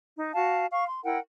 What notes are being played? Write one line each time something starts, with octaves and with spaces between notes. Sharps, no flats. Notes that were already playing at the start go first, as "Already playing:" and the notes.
D#4
F#4 F5 A5
F5 C#6
C6
E4 A#4 F#5 G5